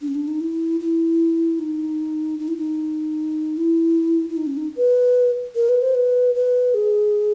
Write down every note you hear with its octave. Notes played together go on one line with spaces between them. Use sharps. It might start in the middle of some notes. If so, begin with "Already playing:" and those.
D4
C#4
D4
D#4
E4
E4
D#4
D#4
E4
D#4
E4
E4
D#4
C#4
D#4
B4
A#4
B4
C5
B4
B4
G#4